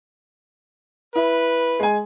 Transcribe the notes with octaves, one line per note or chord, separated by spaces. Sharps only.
E4 B4
G#3 G#5